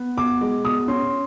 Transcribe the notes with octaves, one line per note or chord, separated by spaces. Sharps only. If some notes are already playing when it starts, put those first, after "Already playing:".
Already playing: B3
B2 D6
G#3
B2 D#6
C#4 C6